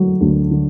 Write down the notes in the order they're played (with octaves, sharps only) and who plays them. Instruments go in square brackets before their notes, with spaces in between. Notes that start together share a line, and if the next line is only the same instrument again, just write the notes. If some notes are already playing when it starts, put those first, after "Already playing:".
Already playing: [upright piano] D3 F#3 A3
D2
D3